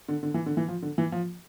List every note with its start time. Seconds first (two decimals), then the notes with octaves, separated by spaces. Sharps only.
0.09 D3
0.23 D3
0.34 E3
0.46 D3
0.57 E3
0.68 F3
0.82 D3
0.98 E3
1.12 F3